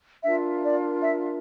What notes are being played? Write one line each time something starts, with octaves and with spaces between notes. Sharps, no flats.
D4 F4 A#4 E5
D5
E5